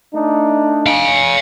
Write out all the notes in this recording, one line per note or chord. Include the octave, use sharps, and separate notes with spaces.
A3 D4 D#4
F5 G#5